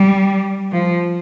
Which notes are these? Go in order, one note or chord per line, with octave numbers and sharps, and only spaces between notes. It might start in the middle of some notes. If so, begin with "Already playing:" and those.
Already playing: G3
F3